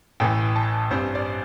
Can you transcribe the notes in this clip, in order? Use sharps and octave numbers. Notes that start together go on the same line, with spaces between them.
A1 A2 E3 G5
A5
A1 G2 G3 C4 C5
D5